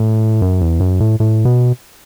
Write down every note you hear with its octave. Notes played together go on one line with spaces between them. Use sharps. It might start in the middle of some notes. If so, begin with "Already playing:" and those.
Already playing: A2
F#2
E2
F#2
A2
A2
B2